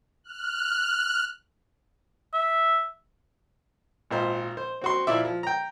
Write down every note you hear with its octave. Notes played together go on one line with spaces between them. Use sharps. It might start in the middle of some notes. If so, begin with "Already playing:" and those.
F6 F#6
E5
G#1 A#2 C5
C5
C4 F#4 C6
A#2 F3 E4 D5 E5
F3
G5 A#5